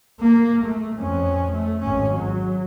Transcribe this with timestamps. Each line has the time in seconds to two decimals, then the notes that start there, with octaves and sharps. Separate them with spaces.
0.20 A#3
0.65 A3
0.96 F2 C#4
1.52 A3
1.82 G#1 C#4
2.13 F#3